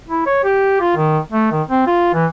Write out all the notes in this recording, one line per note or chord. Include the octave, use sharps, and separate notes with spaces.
E4
C#5
G4
F4
D#3
A3
D#3
C4
F4
E3